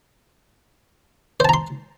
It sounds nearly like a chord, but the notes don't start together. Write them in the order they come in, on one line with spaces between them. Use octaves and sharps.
C5 A5 A#5 C6